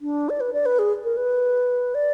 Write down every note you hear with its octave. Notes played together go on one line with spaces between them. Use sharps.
D4
D5
B4
D5
B4
G#4
A#4
B4
D5